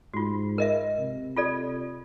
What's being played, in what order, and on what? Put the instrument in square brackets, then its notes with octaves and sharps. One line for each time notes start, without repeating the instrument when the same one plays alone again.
[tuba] G#2 [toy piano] F4 F#4
[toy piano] A#4 D#5 E5
[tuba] C3
[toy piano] F4 A4 D5